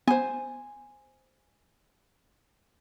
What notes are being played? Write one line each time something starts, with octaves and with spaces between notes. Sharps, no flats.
B3 C5 G#5